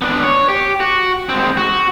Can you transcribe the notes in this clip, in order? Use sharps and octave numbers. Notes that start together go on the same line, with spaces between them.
B3 D4
C#5
G4
F#4
G#3 C4
F#4